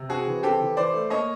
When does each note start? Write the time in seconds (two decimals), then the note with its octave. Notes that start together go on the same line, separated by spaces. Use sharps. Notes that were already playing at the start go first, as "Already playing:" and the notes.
Already playing: C3
0.09 C4 F#4 G#4
0.27 E3
0.43 C4 G4 A4
0.60 E3
0.77 E3 C5 D5
0.93 A3
1.10 A#3 C#5 D#5